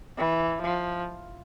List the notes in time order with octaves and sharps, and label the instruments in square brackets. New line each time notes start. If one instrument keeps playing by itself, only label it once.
[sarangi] E3
F3